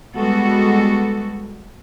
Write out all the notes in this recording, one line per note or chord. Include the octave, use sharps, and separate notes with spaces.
G3 G#3 B3 F#4 A4